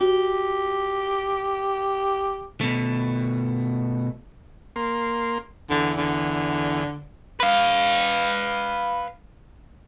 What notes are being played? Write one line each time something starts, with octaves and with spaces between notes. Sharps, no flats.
F#4 G4
B2 A3
A#3 C6
E2 D3
D3
B4 F5